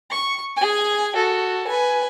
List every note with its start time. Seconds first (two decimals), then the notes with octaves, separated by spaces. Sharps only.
0.10 C#6
0.57 G#4 G#5
1.15 F#4 A4
1.67 B4 G#5